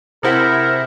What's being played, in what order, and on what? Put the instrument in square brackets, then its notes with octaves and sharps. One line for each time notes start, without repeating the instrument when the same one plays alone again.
[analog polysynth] C3 E4 [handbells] G#4 C5 F#5 [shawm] A#4